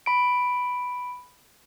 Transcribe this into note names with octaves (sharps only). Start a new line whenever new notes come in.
B5 D7